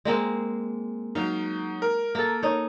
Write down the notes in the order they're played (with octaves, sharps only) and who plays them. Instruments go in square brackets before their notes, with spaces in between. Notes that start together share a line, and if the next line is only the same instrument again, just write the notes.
[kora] G#3 A#3 C4
[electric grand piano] F#3 D#4 [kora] F5
[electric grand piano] A#4
[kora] A#3 A4
D#4 C#5